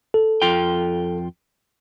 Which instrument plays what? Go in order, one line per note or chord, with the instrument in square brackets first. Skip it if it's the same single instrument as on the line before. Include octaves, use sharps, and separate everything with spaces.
[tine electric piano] A4
[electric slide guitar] F2 F4 G5